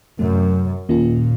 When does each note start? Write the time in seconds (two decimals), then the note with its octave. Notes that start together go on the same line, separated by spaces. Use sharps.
0.19 F#2 C3 F#3 A3
0.89 D#2 A#2 D#3 A#3 C#4 F4